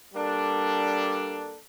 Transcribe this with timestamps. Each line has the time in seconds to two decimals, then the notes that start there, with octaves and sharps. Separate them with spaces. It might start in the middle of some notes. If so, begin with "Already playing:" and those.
0.13 G3 A#3 D4 A4